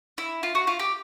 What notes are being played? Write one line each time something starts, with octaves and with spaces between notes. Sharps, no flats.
E4
F4
F#4
F4
G4